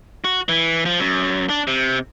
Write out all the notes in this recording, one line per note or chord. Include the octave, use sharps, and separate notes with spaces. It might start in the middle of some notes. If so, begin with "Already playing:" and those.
F#4
E3
F3
F#2
D4
C3